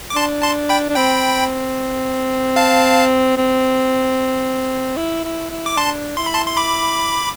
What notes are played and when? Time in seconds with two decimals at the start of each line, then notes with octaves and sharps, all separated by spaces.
0.10 D6
0.15 D4 A5 C6
0.42 A5 C6
0.69 G5 B5
0.89 D4
0.96 C4 G5 B5
2.56 F5 A5
3.37 C4
4.97 E4
5.24 E4
5.50 E4
5.66 D6
5.77 D4 A5 C6
6.17 E4 C6
6.26 B5
6.34 A5 C6
6.47 C6
6.57 B5 D6